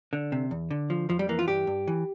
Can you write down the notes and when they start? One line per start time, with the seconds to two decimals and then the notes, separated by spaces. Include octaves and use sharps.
0.13 D3
0.32 C3
0.51 E2
0.71 D3
0.90 F3
1.09 F2 F3
1.19 G3
1.29 E3 A#3
1.39 F4
1.48 G2 G4
1.67 G2
1.87 E3